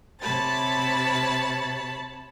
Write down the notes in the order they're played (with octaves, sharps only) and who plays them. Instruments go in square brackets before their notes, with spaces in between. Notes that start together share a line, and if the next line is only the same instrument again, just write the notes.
[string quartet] C3 C#5 A5 B5 A6